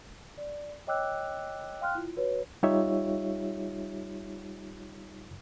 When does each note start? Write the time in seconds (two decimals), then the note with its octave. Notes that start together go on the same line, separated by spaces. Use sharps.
0.38 D5
0.87 C#5 D#5 G5 D6 E6 F#6
1.81 F5 G5 C6 F6 F#6
1.95 E4 F4
2.17 F#4 B4 C#5
2.63 G3 D#4 F4 G4 C#5 E5